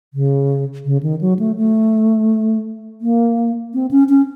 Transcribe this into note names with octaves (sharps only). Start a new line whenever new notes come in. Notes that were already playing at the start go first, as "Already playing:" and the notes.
C#3
C#3
D#3
F#3
A3
A3
A#3
C4
C#4
C#4